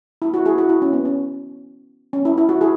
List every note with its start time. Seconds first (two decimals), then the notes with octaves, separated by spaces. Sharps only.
0.22 E4
0.34 F#4
0.45 E4 G#4
0.58 F#4
0.69 E4
0.82 C#4
0.93 B3
1.05 C#4
2.13 C#4
2.25 E4
2.38 E4
2.49 F#4
2.61 E4 G#4